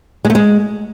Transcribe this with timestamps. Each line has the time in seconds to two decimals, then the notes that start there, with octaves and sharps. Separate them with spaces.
0.25 G#3
0.30 A3
0.35 G#3